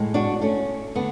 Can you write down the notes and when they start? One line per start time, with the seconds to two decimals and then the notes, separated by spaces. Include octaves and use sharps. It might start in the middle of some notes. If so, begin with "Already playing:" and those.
Already playing: A2 G#3
0.14 D4 F#4
0.41 A3 C#4
0.95 D3 A3 B3